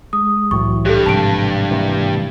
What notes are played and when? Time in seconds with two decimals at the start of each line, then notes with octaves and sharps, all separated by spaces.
0.13 G#3 D#6
0.51 C2 A2 E3 F#3 C#6
0.86 G2 G4 A4
1.06 A1 G#2 C3 F3 A5 D7
1.71 E3 A#3